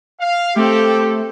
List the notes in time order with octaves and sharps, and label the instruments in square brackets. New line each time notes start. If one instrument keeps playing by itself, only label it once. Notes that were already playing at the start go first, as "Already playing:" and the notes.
[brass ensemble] F5
[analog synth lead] A3 [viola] C4 A4 [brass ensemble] G4